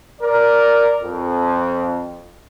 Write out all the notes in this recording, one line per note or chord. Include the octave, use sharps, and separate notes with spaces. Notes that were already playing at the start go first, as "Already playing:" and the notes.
A#4 D5
F2